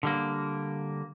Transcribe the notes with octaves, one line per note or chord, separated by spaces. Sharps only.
D3 G3 A#3